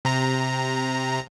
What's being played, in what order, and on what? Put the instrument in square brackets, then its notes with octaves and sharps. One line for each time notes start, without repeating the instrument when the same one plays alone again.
[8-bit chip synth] C3 A#5